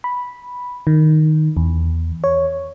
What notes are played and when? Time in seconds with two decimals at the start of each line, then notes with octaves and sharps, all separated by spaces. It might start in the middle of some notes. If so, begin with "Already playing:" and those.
0.04 B5
0.87 D#3
1.57 E2
2.24 C#5